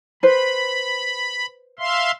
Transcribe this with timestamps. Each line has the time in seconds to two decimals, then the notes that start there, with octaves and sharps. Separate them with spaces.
0.23 B4 C5 B5
1.79 E5 F5 C6